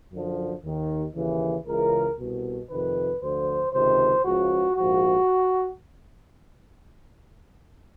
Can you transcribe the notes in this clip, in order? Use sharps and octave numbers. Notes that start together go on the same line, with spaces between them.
F#2 D3 F3
D#2 D#3
D#2 C#3 E3
C#2 C#3 E3 A#4
C2 B2
F2 C3 D#3 B4
D2 D3 F3 C5
C#2 C3 D#3 C5
C#2 C#3 F3 F#4
A#1 G#2 F3 F#4